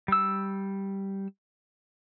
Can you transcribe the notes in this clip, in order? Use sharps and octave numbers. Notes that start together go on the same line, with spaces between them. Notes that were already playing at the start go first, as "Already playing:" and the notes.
G3 E6